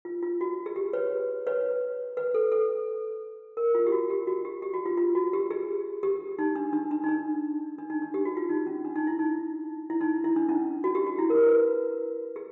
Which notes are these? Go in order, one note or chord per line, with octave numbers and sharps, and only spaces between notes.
F4
F4
F#4
G#4
G4
B4 C#5
B4 C#5
B4
A4
A4
A#4
F4
G4
F#4
G4
F#4
G4
G4
F#4
F4
F4
F#4
G4
G#4
G4
D#4
D4
D4
D4
D#4
D4
D4
D#4
D4
G4
F#4
F4
D#4
C#4
D4
D#4
E4
D#4
E4
D#4
E4
D4
C#4
F#4
G4
F#4
E4
A#4
B4
G#4